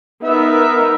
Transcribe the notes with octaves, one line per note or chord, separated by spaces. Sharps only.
B3 D#4 A#4 E5